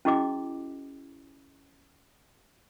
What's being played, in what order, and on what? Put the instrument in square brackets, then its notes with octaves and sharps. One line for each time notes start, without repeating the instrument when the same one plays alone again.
[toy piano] C#4 E4 F#4 G#4 D#5 D6